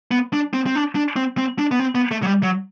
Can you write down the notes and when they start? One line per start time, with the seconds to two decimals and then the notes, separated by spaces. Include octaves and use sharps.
0.11 B3
0.33 D4
0.53 C4
0.66 C4
0.75 D4
0.95 D4
1.16 C4
1.38 C4
1.59 D4
1.71 B3
1.80 C4
1.95 B3
2.11 A3
2.23 F#3
2.27 G3
2.43 F#3